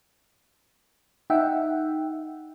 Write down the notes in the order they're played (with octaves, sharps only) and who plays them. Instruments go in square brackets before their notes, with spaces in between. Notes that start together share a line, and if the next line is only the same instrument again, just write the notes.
[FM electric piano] D#4 E5 F#5 G5